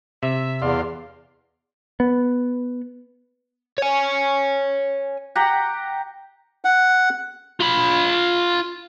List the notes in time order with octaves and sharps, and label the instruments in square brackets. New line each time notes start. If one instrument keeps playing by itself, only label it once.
[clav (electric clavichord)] C3 [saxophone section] E5
[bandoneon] E2 [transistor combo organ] D5 F5 C6
[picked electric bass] B3
[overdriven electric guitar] C#5 G#5
[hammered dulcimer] G4 F#5 A#5
[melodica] F#5
[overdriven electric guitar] F4 B5